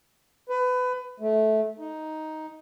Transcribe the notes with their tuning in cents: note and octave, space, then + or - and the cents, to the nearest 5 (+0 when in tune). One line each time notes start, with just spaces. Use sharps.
B4 +25
A3 -15
D#4 +5